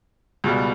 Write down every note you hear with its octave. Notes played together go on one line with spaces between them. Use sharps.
C#2 B2 G3